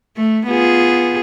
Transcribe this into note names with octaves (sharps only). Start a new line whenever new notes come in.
A3
B3 F4 G#4